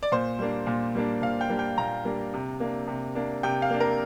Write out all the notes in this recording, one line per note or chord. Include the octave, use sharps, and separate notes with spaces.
D5
A#2 C5
G3 A#3 D4
A#2
G3 A#3 D4
A#2 F5
G5
G3 A#3 D4
G5
A#2 A#5
G3 A#3 D4
C3
A#3 D4
C3
A#3 D4
C3 G5
F5
A#3 D4
A#4